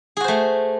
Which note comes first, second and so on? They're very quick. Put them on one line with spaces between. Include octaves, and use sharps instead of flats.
G#4 F#4 C5 A3